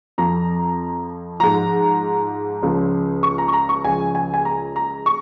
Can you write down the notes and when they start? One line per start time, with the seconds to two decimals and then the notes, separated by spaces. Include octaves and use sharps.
0.18 F2 F3 A#5
1.40 G#2 F3 A#5
2.62 C#2 C#3 F3
3.23 C#6
3.38 A#5
3.48 C#6
3.53 A#5
3.69 C#6
3.84 C#2 C#3 F3 G#5
4.15 G#5
4.34 G#5
4.45 A#5
4.76 A#5
5.06 C#6